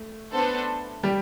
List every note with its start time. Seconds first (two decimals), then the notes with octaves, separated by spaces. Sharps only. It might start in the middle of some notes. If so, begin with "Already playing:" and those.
Already playing: A3
0.32 B3 D4 A4 C5
1.03 G3 G4